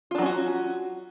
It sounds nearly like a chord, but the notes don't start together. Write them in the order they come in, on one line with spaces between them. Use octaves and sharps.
F4 D4 F#3 C#4 F#4